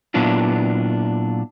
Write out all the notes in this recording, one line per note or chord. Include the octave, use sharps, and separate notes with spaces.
A#2 F#3 B3 D4 E4 F4